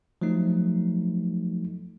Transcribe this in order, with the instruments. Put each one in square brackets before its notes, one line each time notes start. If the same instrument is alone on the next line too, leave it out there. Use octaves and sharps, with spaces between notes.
[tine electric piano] F3 F#3 A3 D#4